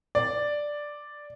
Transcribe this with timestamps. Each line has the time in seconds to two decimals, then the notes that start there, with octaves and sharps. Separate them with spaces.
0.15 D5